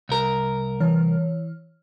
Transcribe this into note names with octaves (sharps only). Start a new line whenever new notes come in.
C2 A#4
E3 C#5 F6